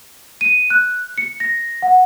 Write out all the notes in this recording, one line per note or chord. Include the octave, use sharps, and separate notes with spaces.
D#7
F#6
C#7
A#6
F#5